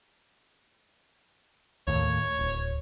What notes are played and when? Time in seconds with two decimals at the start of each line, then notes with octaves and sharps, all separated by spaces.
1.87 D#2 A2 C#5
2.39 D1